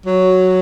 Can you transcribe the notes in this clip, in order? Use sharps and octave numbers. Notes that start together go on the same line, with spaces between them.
F#3